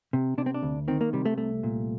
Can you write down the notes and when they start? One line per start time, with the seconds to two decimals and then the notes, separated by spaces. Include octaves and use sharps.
0.13 C3
0.38 C3 D4
0.46 C4
0.54 D4
0.63 D2
0.88 D#3 C4
1.01 A#3
1.13 C3 G3
1.25 A3
1.38 C2 A3
1.63 A#2